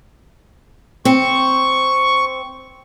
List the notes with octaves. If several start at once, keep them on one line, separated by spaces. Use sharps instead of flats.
C4 C#6